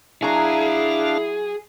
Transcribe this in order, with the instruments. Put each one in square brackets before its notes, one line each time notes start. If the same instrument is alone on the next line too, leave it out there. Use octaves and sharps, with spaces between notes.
[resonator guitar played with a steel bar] F#3 A#5 [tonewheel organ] D4 F5 [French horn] E4 [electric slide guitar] G#4